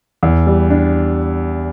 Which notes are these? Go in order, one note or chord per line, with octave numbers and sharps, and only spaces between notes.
E2
G3
D4